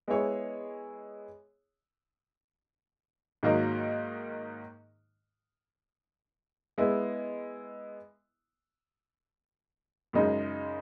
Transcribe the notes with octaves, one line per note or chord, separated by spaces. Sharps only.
G#3 B3 E4 G#4 C#5
G#2 D#3 F#3 A#3 D#4
G#3 B3 E4
F#2 C#3 G#3 D#4